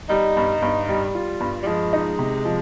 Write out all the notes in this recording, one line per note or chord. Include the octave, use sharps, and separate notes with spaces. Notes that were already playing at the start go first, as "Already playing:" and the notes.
G3 D#4
G2
G2
G3
F4
G2
G3
F3 G#3
D#4
C3
F3